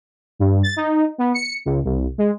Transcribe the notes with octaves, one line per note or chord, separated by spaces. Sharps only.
G2
A6
D#4
B3
C#7
C#2
C2
G#3